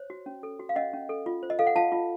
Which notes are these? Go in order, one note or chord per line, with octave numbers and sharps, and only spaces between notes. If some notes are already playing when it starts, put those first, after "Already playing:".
Already playing: C5 C#5
F#4
C#4
A4
F#4
F5
C#4 D#5 F#5
C#4
A4
F4
C5
D#5
A4 F5
F#5
F4 F5 A5
F4